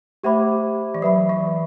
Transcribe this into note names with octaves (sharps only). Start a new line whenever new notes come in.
A3 G4 C5 E5 B5 D6
E3
F#3 B4 E5 B5
E3